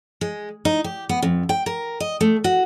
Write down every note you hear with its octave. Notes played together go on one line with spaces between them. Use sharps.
G#3
D#4
G4
B3
F2
G5
A#4
D#5
A3
F#4